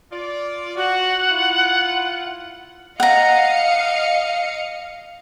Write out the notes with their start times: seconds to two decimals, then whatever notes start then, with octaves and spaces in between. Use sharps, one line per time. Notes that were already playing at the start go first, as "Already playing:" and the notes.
0.12 F4 D5
0.77 F#4 F#5
1.30 E4 F4
3.00 D#5 F5 F#5 A#5 C#7